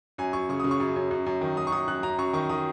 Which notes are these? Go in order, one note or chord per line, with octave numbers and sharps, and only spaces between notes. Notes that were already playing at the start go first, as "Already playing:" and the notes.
F#2 G#5
F#2 C#6
C#3 C#6
C#3 D#6
C#6
F#2
F#2
F#2
F#2
D#3
D#3 D#6
C#6
F#2 D#6
F#2 F#6
F#2 A#5
F#2 C#6
D#3 C#6
D#3 D#6